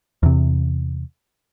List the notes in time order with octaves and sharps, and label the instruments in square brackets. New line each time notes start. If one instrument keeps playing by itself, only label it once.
[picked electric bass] E2 C3